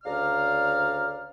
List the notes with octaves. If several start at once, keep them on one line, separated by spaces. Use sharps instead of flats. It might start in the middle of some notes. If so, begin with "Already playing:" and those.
D2 C#3 D5 F5 A#5 F6